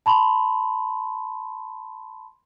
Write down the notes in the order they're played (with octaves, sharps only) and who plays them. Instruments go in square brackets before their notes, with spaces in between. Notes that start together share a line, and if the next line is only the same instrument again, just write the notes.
[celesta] A5 B5 C6